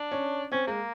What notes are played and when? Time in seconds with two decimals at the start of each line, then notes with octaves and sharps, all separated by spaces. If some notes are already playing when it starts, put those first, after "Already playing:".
Already playing: D4
0.11 C#4
0.52 C4 C#4
0.67 G#3 A#3